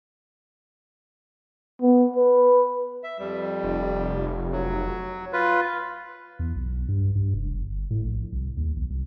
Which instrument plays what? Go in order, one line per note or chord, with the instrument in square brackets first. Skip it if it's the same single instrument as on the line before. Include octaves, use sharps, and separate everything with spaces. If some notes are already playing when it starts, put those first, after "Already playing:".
[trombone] B3
B4
[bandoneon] E5
F2 G3
[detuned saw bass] F1
[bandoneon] F#3
F4 B4
[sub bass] E2
B1
G2
G2
F1
G1
A2
A#1
C2
D#2
B1
C2